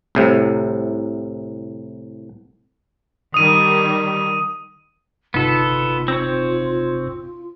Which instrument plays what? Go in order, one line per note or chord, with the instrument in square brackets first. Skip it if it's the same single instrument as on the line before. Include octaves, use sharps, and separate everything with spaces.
[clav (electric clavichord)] C2 A2 C3
[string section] D#3 G3 [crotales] D#6 D#7
[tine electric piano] G1 C3 D#4 [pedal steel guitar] B3 A4 [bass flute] F4
[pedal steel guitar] C4 C#5